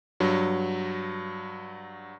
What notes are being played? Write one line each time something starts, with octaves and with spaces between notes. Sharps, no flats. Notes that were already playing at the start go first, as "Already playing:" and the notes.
G2 F#3